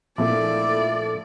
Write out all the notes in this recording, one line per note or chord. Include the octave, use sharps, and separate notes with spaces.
A#1 F3 A3 E4 A4 D5